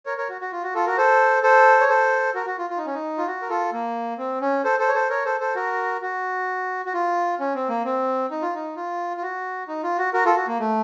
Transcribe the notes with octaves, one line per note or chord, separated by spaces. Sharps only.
A#4 C#5
A#4 C#5
F#4
F#4
F4
F#4
F4 A4
F#4 A#4
A4 C5
A4 C5
C#5
A4 C5
F#4 A#4
F#4
F4
F4
D#4
C#4
D#4
F4
F#4
A#4
F4 A4
A#3
C4
C#4
A4 C5
A4 C5
C#5
A4 C5
A#4 C#5
A4 C5
A4 C5
F#4 A#4
F#4
F#4
F4
C#4
C4
A#3
C4
D#4
F4
D#4
F4
F4
F#4
D#4
F4
F#4
F#4 A#4
F4 A4
F#4
A#3
A3